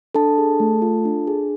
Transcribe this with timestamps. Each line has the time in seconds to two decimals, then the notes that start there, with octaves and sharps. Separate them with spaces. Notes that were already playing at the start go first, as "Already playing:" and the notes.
0.15 D4 A4 A5
0.38 G#4
0.60 A3
0.82 F4
1.05 D4
1.27 G#4